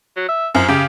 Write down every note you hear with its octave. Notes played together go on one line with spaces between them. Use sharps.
F#3
E5
F#2 F3
C#3 G4